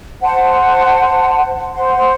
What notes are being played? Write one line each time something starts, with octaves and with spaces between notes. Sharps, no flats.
C5 F#5 A5 C6
C5 F#5 C6